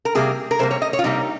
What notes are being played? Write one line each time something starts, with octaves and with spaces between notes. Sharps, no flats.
A#4
C3 G3 A#3 G#4
A#4
C3 G3 A#3 C5
C#5
D#5
C#5
F4
C3 G3 A#3 D#4